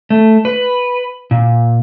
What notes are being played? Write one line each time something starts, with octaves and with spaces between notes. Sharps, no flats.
A3
B4
A#2